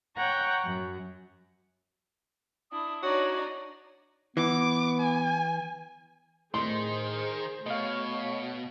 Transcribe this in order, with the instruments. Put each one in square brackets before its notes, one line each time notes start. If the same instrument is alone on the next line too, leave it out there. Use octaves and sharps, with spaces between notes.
[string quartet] C#5 F#5 G5 A#5 C#6
F#2
[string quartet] D4 E4 [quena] D#6
[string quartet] D4 D#4 D5 [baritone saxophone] F#4 [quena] C#5
[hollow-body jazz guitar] E3 [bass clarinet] B3 [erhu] D6
[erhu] G#5
[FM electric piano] A2 [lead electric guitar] D#3 [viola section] G#4 C5 [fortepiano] C6
[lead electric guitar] B2 [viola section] A3 C#5 [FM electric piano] D#5 F5